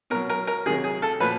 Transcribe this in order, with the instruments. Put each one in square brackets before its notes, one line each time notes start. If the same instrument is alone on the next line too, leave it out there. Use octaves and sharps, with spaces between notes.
[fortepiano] B2 F#3 A#4
A#4
A#4
C3 D#3 F#3 G#4
G#4
A4
A#2 F3 B4